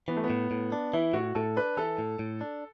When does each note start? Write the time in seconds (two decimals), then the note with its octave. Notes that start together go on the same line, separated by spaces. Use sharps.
0.08 E3 B3
0.17 A3
0.24 B3
0.30 A2
0.51 A2
0.72 D4
0.93 E3 E4
1.13 A2 F#4
1.35 A2 A4
1.56 D4 B4
1.77 E3 A4
1.98 A2
2.19 A2
2.41 D4